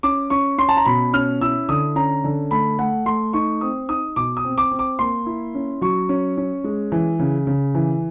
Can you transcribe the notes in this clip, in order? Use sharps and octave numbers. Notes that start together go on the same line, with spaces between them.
C#4 D6
C#4 C#6
C#4 C6
A5
A#5
B2 B5
C#4 F6
E4 E6
D3 D#6
C#4 A#5
D3
A3 B5
A3 F#5
A3 C6
D#4 C#6
C4 D#6
D#4 D#6
B2 D6
D#6
C4
D6
C4
D6
A#3 C6
E4
C#4
F#3 C#6
C#4
C#4
G#3
E3
C#3
C#3
E3